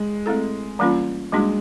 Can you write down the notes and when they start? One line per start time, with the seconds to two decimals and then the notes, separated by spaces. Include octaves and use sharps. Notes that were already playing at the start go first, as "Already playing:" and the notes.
Already playing: G#3
0.26 A3 C4 E4 A4
0.79 E3 G3 A#3 C#4 F4
1.32 G3 G#3 A#3 D4 F#4